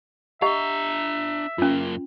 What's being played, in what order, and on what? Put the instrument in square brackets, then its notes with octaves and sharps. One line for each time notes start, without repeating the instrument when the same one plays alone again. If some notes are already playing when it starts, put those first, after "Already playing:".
[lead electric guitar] D4 A#5 [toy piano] G4 D#5 F#5 [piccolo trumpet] E5
[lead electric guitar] F#2 A#3 [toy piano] C#4 F4